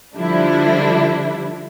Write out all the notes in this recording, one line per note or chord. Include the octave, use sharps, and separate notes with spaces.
D3 F3 G3 D4 E4